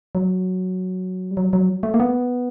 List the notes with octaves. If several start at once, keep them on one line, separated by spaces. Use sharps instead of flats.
F#3
G3
F#3
F#3
A3
A#3
B3